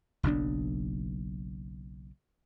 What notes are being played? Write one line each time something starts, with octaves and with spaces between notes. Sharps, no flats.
F#1 B1 F#2 D4